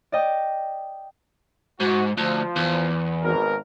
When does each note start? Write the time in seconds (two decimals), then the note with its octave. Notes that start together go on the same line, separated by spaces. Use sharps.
0.12 D5 D#5 G5
1.80 G#2 F#4
2.17 D2 F3
2.56 E2
3.23 G#1 B2 A#4